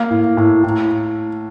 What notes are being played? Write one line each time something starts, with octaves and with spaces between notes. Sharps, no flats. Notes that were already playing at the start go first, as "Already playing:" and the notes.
Already playing: A#3 F5
A2
A2
A2